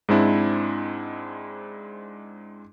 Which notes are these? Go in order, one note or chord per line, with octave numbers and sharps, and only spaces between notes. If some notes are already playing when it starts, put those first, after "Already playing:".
G#2 G#3 C4 D4 E4